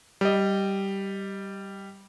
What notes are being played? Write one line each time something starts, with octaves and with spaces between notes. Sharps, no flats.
G3 D#5